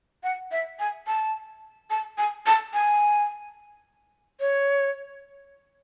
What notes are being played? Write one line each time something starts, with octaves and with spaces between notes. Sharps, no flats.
F#5
E5
G#5
A5
A5
G#5
A5
G#5
C#5